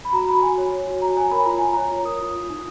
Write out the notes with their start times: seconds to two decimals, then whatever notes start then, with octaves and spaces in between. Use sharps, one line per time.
0.05 B5
0.13 F#4 A#5
0.28 F#4 B5
0.42 F#4 G#5
0.58 C#5
0.72 C#5
0.87 F#4
1.02 F#4 A#5
1.17 C#5 G#5
1.31 A#4 B5
1.45 F4 A#5
1.58 F4 G#5
1.73 C#5 A#5
1.91 F4
2.05 A#4 D#6
2.20 F4
2.35 F4
2.50 D#4